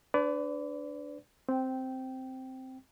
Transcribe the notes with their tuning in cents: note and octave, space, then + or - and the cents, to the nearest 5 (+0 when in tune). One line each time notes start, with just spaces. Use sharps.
D4 +0 B4 +30 D5 -25
C4 +0 G5 -15